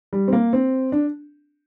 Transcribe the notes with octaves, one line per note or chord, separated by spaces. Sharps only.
G3
C4
A#3
C4
D4